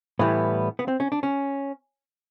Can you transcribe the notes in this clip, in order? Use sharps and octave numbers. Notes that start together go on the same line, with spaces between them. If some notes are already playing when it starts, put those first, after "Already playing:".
A2 E3 G3 B3
B3
C4
C#4
D4
C#4